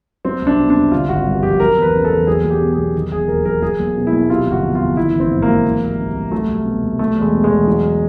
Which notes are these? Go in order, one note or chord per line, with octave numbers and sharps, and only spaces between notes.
F#3 C4
C2
D4
B2
D4
C2
D3 F4
G#1 F#4
G2
F3 G4
F#3 A#4
E2
B4
C#3
A4
E2
F#3 G#4
B1
G4
B2
G#4
B1
D#3
E1 G#4
D#2 A#4
F#3 A#4
F#3 G#4
B1
B2
E4
B1
C3 F4
G1 F#4
F2
F4
G1
D#3 E4
A1
C4
G#2
A#3
F#3
E3
C2
C3
C2
F#3 A3
C2
B2
C2
F#3 A3
E2
G#3
B2
G#3
E2
F#3